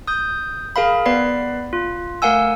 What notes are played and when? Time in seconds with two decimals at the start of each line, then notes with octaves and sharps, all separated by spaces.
0.08 D#6 G6
0.76 G#4 A#4 F5 B5
1.06 B3 B4 D5 B5 C7
1.73 F4
2.22 A3 A#4 F5 F#5 G#5 E6